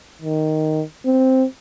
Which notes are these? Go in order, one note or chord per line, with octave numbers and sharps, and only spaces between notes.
D#3
C4